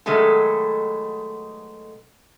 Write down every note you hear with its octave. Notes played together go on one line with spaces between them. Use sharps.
B2 D#3 F#3 G#3 A3 A4